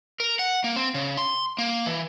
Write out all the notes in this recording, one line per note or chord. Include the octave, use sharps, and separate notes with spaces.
A#4
F#5
A#3
C4
C#3
C6
A#3
E3